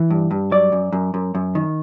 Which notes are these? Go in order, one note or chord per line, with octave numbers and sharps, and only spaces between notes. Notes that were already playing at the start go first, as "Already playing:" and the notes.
Already playing: E3
G2
G2
F#3 D5
F#2
F#2
F#2
F#2
D#3